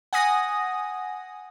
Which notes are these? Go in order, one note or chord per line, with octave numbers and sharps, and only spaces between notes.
F#5 G#5 D#6 A#6